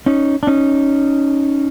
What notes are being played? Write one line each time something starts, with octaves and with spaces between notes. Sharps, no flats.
C#4 D#4
D4
C#4 D#4